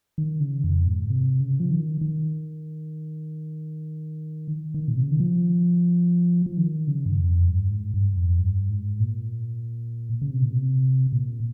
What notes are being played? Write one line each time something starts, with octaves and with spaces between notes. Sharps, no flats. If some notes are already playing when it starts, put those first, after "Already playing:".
D#3
C#3
F2
G#2
C3
C#3
F3
D#3
D#3
D#3
A#2
C3
C#3
D#3
F3
F3
D#3
C#3
G2
F2
G2
G#2
G2
F2
G2
G#2
A#2
C#3
C3
A#2
C3
A#2